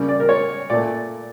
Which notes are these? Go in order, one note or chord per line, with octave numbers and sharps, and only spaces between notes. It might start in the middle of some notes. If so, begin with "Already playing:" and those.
Already playing: C#3 G3 A#3
D5
A#4
C#5
A#2 A3 D5